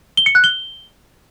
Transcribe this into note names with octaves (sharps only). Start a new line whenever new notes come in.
G7
C#7
F#6
G7